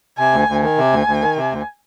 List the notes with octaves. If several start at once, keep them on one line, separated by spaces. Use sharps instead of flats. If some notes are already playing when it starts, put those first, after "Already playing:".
C3 G#5
D2
D2
D#3 G#5
C3
D2
D2
D#3
C3
D2